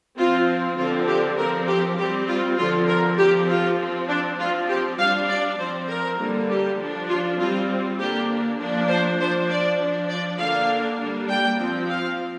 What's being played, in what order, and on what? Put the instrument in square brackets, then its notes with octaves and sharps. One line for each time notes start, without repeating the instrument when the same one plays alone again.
[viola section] F3 C4 F4
D3 F3 C4 F4
G4
F3 C4 A#4
G4
G3 C4 G4
F4
D3 F3 C4 F4
A#4
C4 G4
F3
F4
F3 C4
D4
F3 C4 F4
G4
G3 D4 F5
D5
F3 C4 C5
A#4
D3 G3 A#3
G4
F3 D4
F4
G3 C4 F4
D3 A#3 D4 G4
F3 A#3 D4
C5
F3 D4 C5
D5
F3 D4
D5
D3 A#3 D4 F5
G3 A#3 D4
G5
F3 C4
F5